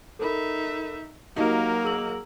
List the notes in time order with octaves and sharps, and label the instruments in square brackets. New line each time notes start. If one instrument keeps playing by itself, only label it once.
[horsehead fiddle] D#4 E5 [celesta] A4 A#4 B5
[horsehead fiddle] F#3 A#4 [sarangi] A#3 [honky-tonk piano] D#4 [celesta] F#4 G4 F5
[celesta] G#4 E6 F#7